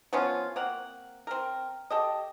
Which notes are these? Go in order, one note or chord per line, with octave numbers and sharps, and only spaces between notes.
F3 B3 C#4 F4
A#3 C4 F#5
C4 A#4
G4 A4 D#5